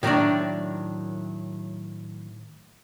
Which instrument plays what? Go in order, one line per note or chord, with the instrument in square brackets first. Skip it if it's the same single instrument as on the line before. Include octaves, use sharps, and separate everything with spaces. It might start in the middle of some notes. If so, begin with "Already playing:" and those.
[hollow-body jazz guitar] A2 D#3 F#3 A#3 D4 D5